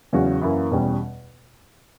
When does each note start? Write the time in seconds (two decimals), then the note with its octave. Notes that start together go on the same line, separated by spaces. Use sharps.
0.13 E2 C#3 F#3 C#4 F#4
0.42 F#2 E3 A#3 E4
0.71 E2 B2 G3 C#4